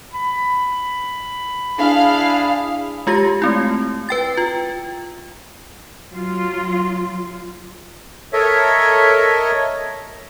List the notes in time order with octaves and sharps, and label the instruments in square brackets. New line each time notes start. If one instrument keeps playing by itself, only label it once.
[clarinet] B5
[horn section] D4 E4 G#4 [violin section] F5
[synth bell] G#3 F4 G4 A#6
A3 C4 E4
B4 G5 A6
F4
[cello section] F#3 F4
[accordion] A4 A#4 C#5 D#5 E5